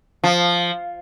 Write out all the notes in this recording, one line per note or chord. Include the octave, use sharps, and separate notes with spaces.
F3